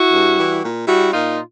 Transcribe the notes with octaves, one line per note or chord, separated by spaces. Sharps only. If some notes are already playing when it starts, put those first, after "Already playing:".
Already playing: E4 F#4
G2
E3 G3
A#2
G3 E4 F#4
A#2 D#4 F4